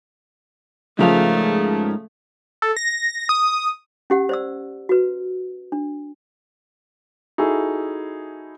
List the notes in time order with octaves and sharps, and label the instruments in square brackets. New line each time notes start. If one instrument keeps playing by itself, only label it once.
[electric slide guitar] G#2 A#4 F5 [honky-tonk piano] C#3 F3 G#3 [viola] A3
[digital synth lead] A4
A#6
D#6
[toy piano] C#4 G4 F#5
C5 D5 E6
F#4 B4
D4
[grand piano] D#4 E4 F#4 G#4 A4